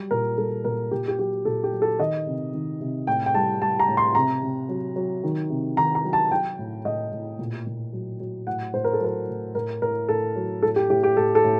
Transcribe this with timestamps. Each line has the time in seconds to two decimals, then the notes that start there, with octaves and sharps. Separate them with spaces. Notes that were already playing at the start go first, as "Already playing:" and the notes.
Already playing: F#3 G3
0.11 A#2 A#4
0.37 G3 A4
0.65 A#2 A#4
0.91 A#2 G4
1.08 G4
1.19 F#3 G4
1.45 A#2 A4
1.64 G4
1.73 F#3
1.82 A4
1.99 D#3 D#5
2.27 C3
2.54 D#3
2.81 C3
3.07 A2 G5
3.26 G5
3.35 G3 A5
3.61 G3 A5
3.79 A#5
3.88 A2
3.97 C6
4.15 C3 A#5
4.43 C3
4.69 F#3
4.96 F#3
5.24 D#3
5.50 C3
5.77 D#3 A#5
5.95 A#5
6.04 F#3
6.13 A5
6.31 F#3 G5
6.59 A2
6.85 A2 D#5
7.12 A2
7.39 A#2
7.66 A#2
7.93 F#3
8.20 F#3
8.47 A2 F#5
8.74 A2 C5
8.84 A#4
8.93 A4
9.00 F#3 A#4
9.28 A2
9.55 A2 A#4
9.82 A2 A#4
10.09 A2 A4
10.36 F#3
10.63 A2 A4
10.76 G4
10.90 A2 G4
11.03 G4
11.17 A2 A4
11.35 A4
11.44 A2